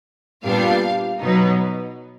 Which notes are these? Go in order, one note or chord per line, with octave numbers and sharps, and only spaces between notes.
A#2 G3 B3 D4 F5
B2 F#3 B3 D#4